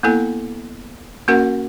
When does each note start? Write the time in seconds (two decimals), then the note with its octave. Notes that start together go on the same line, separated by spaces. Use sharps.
0.03 A#3 B3 E4 A4 G#5
1.28 A#3 C#4 F#4 A#4 F#5